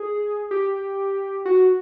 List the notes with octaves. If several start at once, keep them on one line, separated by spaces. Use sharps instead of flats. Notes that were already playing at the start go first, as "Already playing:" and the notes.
Already playing: G#4
G4
F#4